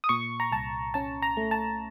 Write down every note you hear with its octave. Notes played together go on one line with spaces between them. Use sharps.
D#6
A#2 C#6
A#5
C2 A5
C#4 A5
A#5
A3
A5